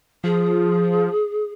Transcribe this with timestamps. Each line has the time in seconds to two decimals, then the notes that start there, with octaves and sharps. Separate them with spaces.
0.24 F3 G#4